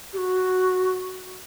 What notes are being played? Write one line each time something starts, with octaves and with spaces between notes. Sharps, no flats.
G4
F#4